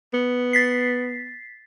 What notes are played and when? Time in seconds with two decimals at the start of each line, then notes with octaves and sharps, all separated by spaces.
0.14 B3
0.53 A6 B6 C7